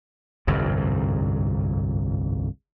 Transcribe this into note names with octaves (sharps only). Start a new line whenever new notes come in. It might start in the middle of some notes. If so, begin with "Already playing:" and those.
G1 C2 F2 G#2